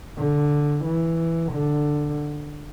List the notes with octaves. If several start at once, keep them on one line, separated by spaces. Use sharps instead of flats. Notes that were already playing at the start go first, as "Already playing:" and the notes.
D3
E3
D3